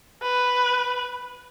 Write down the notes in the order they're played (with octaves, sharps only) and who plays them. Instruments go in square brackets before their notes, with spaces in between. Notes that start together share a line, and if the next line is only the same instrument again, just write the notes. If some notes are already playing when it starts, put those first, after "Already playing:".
[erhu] B4